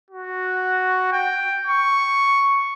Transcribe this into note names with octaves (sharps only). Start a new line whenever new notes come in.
F#4
G5
C#6